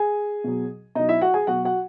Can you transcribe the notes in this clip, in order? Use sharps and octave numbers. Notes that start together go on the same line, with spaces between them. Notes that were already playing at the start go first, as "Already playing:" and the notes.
Already playing: G#4 G#5
B2 F#3
B2 F#3 D#4 D#5
E4 E5
F#4 F#5
G#4 G#5
B2 F#3 F#4 F#5
F#4 F#5